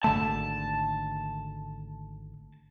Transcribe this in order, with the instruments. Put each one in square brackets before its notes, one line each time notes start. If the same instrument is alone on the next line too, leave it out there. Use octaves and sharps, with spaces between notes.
[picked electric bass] G#1 D3 A3 [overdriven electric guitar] A5